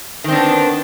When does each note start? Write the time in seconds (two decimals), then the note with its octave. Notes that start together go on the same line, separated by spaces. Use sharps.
0.24 D#3
0.28 C4
0.32 D4
0.36 B3